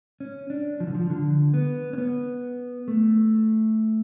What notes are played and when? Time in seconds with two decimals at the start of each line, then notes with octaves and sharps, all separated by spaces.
0.20 C#4
0.50 D4
0.80 F3
0.87 D3
0.95 F3
1.10 D3
1.54 B3
1.93 C#4
1.98 B3
2.88 A3